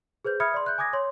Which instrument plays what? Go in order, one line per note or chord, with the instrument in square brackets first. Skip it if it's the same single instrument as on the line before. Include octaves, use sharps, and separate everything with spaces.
[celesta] G#4 B4 C5 G6
E5 B5 D#6 F6 G#6 C#7
D5 C6
F#6 G6
G#5 D6 D#6 G#6 A#6
C#5 C6